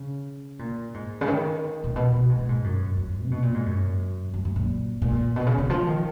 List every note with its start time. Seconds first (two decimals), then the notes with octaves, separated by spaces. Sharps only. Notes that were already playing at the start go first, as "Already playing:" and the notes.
Already playing: C#3
0.59 A#2
0.94 G#2
1.21 C#3
1.28 D#3
1.84 A#2
1.96 B2
2.12 B2
2.29 G#2
2.39 A#2
2.49 G#2
2.64 F#2
2.97 F2
3.25 C#3
3.31 B2
3.42 A#2
3.54 G#2
3.66 F#2
4.34 F#2
4.45 F#2
4.56 A#2
5.02 A#2
5.36 B2
5.47 C#3
5.58 C#3
5.70 F3
5.87 D#3